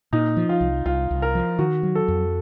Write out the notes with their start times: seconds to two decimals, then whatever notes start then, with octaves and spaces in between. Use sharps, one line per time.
0.13 A#2 D#4
0.37 F3
0.49 F4
0.61 C2
0.85 C2 F4
1.11 C2
1.22 A#4
1.35 F3
1.59 D#3 F#4
1.83 F#3
1.95 A4
2.08 F2